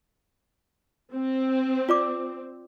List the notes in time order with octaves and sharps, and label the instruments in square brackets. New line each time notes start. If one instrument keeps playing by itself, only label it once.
[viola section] C4
[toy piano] F4 D5 D6